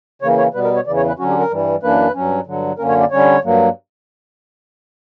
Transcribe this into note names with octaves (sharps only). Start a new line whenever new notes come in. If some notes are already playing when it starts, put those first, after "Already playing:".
C#3 E3 A#3 C#5
C#5
B2 G3 B3 B4
A#4
C#5
E2 C#3 E3 D5
C#5
B4
D3 F#3 C#4 F#4
G4
A#4
G2 E3 G3
F#2 E3 A#3 D4 B4
G2 F#3 C#4
G2 D3 F#3
F#2 D3 A#3 C#4 A#4
C#5
D5
D3 G3 C#4 C#5
G2 F#3 A#3